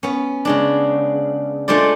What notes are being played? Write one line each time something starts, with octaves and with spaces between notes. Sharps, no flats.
B3 C#4
C#3 G#3 D4
G#3 A3 D4 F4 C5 D5